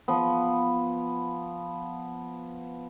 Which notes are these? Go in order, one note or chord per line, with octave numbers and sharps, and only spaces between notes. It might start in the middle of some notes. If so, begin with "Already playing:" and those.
F3 B3